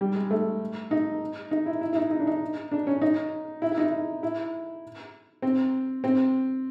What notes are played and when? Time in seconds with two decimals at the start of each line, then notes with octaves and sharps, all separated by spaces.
0.01 G3
0.15 G#3
0.31 A3
0.91 D#4
1.51 D#4
1.66 E4
1.81 E4
1.93 E4
1.96 D#4
2.11 D#4
2.19 D4
2.27 D#4
2.72 D4
2.87 C#4
3.01 D#4
3.62 E4
3.72 E4
3.78 D#4
3.82 E4
4.23 E4
5.42 C4
6.04 C4